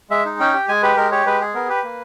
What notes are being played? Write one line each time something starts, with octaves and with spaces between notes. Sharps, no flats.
G#3 E5
D#4
C#4 G5
G4
G#3 G#5
G4 B4
G#3 A#4
G4 C#5
G#3 B4
G#4
B3 A#4
G4 B4
A#3